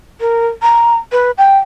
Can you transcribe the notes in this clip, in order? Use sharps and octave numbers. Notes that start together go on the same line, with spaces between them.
A#4
A#5
B4
G5